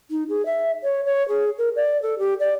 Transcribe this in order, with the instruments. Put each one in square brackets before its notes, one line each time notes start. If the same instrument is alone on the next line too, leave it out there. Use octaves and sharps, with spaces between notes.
[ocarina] D#4
G#4
E5
C#5
C#5
G#4
A#4
D5
A4
G4
D5